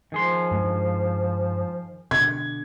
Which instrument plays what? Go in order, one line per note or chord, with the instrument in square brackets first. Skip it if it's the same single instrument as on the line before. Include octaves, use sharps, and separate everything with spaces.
[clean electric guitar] D#3 G#4 C6 [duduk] F3
[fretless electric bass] G2 G#3
[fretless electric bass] B2 D3 [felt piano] G#6